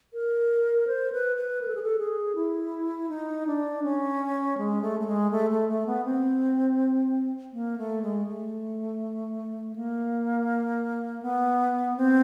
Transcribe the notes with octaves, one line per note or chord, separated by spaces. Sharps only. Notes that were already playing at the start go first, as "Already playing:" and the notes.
A#4
C5
B4
B4
A#4
A4
G#4
A4
G#4
E4
D#4
D4
C#4
G#3
A3
A3
G#3
A3
A3
A3
B3
C4
A#3
A3
G#3
A3
A#3
B3
C4